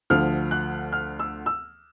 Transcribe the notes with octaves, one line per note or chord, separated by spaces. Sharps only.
D2 D3 F3 F6
F#6
F6
E6
E6